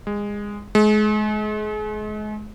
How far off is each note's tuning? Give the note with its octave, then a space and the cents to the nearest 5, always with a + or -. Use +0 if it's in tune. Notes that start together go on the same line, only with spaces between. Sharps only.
G#3 -20
G#3 +35